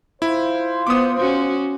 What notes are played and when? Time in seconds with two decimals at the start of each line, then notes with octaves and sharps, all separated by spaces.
0.22 E4 F4 C5
0.87 B3 D6 D#6
1.18 C#4 F#4